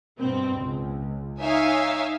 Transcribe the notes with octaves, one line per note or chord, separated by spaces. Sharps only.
G2 B2 C4
C#2
D#4 C#5 E5 F5 G#5